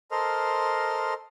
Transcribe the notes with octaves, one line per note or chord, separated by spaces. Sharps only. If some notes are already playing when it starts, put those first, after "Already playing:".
A4 A#4 C5 D#5 C6 F6